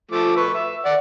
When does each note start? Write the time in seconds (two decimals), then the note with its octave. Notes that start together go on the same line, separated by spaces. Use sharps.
0.11 F3 A3 D6
0.37 B4 C#6
0.54 E5
0.85 D5 F#5